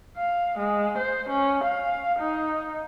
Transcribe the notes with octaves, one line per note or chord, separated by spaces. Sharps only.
F5
G#3
C5
C#4
F5
D#4